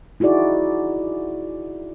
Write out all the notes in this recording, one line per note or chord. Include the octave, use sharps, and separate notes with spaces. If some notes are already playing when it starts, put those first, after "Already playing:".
D#4 E4 F#4 G#4 D5